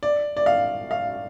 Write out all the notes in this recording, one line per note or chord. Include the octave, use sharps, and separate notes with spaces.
D5
D5
F5
F5